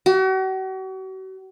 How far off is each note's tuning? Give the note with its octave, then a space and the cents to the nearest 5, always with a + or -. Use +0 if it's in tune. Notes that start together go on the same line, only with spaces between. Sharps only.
F#4 +40